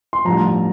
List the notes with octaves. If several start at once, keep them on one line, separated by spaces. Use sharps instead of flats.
C6
A1 G2 F3 A#5